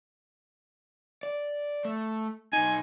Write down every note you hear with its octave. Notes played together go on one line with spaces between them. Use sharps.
D5
A3
B1 D#4 G#5